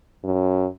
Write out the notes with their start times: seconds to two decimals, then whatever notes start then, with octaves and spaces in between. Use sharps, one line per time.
0.24 F#2